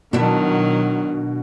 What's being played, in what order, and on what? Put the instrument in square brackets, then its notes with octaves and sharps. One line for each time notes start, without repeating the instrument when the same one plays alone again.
[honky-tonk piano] B2 [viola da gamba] D#3 F#3 [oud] D4 E4